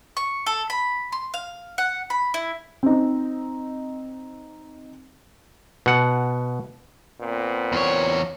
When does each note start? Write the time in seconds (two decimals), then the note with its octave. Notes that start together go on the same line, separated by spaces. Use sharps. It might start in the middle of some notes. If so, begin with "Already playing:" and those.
0.17 C#6
0.46 A4
0.70 B5
1.12 C6
1.34 F5
1.78 F#5
2.10 B5
2.34 E4
2.83 C4 D#4
5.86 B2 F#5
7.21 A#2 B3 C4
7.72 E2 C#5